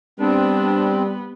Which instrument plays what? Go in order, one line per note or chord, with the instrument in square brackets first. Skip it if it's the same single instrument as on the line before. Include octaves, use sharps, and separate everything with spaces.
[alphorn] G3 [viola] B3 [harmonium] C4 [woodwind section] D4